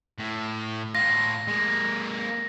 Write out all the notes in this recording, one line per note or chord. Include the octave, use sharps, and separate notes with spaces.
A2
A2 F4 A#6
G#3 A#3